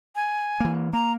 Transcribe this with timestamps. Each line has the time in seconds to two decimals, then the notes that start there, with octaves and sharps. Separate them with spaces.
0.16 G#5
0.60 E3 A#3
0.93 A#3 A#5